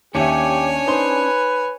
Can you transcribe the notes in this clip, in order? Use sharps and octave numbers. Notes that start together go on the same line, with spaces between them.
D#2 C#4 D4 G4 C#5 E5 G#5
D#4 B4 C5 C6